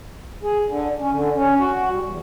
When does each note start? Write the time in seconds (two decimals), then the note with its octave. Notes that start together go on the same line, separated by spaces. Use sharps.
0.43 G#4
0.67 D3
0.99 C#4
1.11 D3
1.35 C#4
1.59 F#4
1.91 G3
2.05 E2